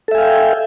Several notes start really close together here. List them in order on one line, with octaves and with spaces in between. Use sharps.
A4 E5 G#5 F5 G5